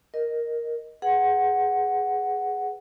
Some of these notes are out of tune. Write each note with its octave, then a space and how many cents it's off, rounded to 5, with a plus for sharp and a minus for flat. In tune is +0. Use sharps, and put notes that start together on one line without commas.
A#4 +5 D#5 +0
G#4 +0 B4 +0 F#5 +0